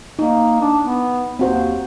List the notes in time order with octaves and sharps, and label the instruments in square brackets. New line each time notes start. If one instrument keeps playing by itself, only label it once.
[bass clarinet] A#3 [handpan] D#4
[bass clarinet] D4
B3
[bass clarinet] D#2 [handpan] C4 F#4 C5